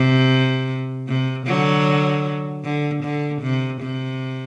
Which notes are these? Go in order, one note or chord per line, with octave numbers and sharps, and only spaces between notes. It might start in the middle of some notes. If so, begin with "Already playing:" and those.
Already playing: C3
C3
D3 F#3
D3
D3
C3
C3